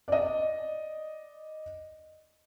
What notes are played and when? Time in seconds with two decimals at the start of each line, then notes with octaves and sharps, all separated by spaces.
0.08 D5 D#5